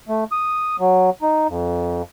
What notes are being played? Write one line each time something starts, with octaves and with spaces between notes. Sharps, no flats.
A3
D#6
F#3
D#4
F2